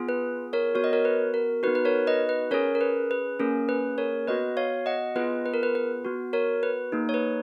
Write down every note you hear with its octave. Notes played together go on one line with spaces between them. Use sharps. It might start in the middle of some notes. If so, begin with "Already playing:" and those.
Already playing: B3 F4 G#4
B4
A#4 C#5
B3 F#4 C#5
D#5
A#4 C#5
B4
A#4
B3 D#4 F#4 B4
B4
A#4 C#5
B4 D#5
B4
C#4 G#4 A#4 C#5
A#4
B4
B4
A#3 C#4 G#4 A#4
B4
A#4 C#5
B3 F#4 B4 D#5
C#5 F5
D#5 F#5
B3 F4 G#4 B4 D#5
B4
A#4
B4
B4
B3 F#4
A#4 C#5
B4
A#3 D#4 G#4
C#5
B4